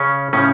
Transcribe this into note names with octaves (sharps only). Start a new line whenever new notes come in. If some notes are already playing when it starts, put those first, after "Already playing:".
Already playing: C#3 C#4
A2 C#3 F3 C#4